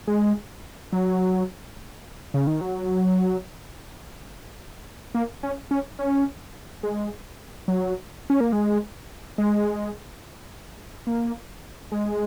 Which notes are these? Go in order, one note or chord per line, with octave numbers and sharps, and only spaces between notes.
G#3
F#3
C#3
D#3
F#3
A#3
C#4
C#4
C#4
G#3
F#3
C#4
A#3
G#3
G#3
A#3
G#3